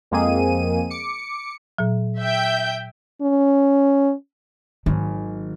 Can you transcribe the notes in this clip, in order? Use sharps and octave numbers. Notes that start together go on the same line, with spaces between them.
F2 G#3 A#3 C4 G#4 D#7
D6 C#7
A#2 F#3
E5 G5 G6
C#4
G#1 D#3 F#3 A#3